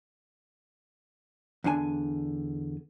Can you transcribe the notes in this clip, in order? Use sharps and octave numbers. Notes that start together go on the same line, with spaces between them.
E2 D3 D4 G#5